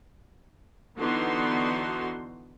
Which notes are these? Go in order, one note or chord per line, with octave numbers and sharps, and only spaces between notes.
D3 E3 B3 D#4 F#4 C6